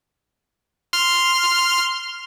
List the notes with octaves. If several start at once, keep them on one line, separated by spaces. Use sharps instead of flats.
C6 F6